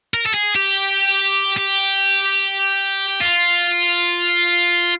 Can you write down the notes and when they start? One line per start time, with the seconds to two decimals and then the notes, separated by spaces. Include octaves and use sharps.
0.14 A#4
0.26 A4
0.34 G#4
0.55 G4
1.57 G4
3.21 F4